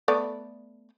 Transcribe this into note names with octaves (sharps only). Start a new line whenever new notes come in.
A3 B3 D5